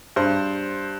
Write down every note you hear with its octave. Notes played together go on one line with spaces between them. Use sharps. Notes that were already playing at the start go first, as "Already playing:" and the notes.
G2 C5